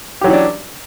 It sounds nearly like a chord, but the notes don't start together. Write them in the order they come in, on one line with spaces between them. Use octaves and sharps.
G4 F#3 E3 C#4 D4